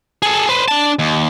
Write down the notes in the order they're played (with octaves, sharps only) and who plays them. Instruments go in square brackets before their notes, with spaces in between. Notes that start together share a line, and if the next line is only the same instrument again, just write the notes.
[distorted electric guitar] G#4 A4
B4 C5
D4 A5
D#2